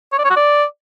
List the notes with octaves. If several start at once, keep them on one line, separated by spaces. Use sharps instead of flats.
C#5
D5
C#5
F#4
D5